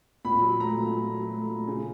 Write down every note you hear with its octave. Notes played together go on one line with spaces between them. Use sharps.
A#2 B5
F#3
A3 A#5
A#2
A#2
F#3
A3
A#2
C#3